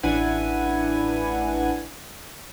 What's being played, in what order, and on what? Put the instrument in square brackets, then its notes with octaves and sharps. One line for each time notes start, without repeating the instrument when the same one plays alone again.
[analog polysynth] A1 D4 E4 B4 F#5 G#5